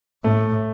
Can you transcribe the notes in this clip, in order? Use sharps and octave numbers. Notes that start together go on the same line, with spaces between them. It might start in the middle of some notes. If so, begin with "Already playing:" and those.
A2 A3